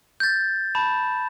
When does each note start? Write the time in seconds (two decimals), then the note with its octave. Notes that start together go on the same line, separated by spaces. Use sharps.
0.20 G6 A6
0.75 A5 B5 E7